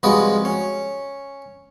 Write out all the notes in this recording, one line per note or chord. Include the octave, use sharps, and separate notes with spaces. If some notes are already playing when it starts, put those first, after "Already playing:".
C2 F3 G#3 F#4 B4 D#5
C#4